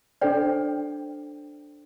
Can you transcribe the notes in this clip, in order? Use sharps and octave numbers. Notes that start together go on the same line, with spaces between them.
D4 A4 C5 D5 G5